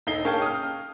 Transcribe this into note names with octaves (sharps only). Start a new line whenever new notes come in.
D#1 D#4 C7 G7
A#3 C#4 G#4 F5 G5 A5
D#6 F6